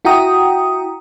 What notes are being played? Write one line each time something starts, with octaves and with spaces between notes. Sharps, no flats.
E4 F#4 G5 A#5 D#6